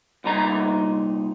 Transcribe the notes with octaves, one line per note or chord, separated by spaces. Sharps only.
C2 A#2 D#4 A#5